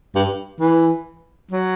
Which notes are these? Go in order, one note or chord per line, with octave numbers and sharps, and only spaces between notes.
G2
E3
F#3